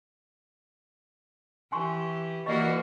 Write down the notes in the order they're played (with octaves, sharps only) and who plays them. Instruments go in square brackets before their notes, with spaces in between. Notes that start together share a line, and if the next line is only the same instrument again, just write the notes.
[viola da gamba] E3 G4 [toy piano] G#5 C6 C#6
[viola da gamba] E3 A#3 F#4 [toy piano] D5 D#5 C#6